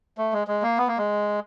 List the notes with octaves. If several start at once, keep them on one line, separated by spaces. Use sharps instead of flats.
A3
G#3
G#3
A#3
B3
A#3
G#3